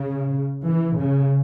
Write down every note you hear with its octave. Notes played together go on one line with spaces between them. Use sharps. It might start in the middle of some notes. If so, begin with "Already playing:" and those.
Already playing: C#3
E3
C#3